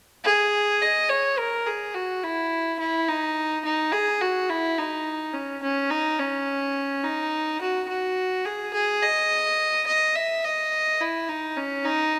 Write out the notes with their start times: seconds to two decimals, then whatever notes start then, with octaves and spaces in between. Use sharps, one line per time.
0.24 G#4
0.82 D#5
1.09 C#5
1.38 A#4
1.66 G#4
1.94 F#4
2.24 E4
2.79 E4
3.08 D#4
3.65 D#4
3.92 G#4
4.21 F#4
4.50 E4
4.78 D#4
5.34 C#4
5.63 C#4
5.91 D#4
6.19 C#4
7.03 D#4
7.61 F#4
7.89 F#4
8.45 G#4
8.74 G#4
9.02 D#5
9.87 D#5
10.15 E5
10.44 D#5
11.00 E4
11.28 D#4
11.57 C#4
11.85 D#4